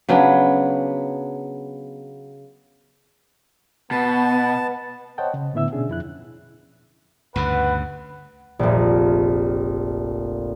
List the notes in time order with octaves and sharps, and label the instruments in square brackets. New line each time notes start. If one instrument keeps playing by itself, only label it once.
[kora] C#3 F#3 B3 D4
[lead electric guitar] B2 [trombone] B3 [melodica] A5
[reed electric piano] C5 C#5 D#5 F#5 G5 A5
C#3
A2 D3 B3 E4 E5 E6
B2 C#4 D4 G#4
F2 E4 F#6
[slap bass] D2 G2 C#3 [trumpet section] B4 F#5
[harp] F1 A#1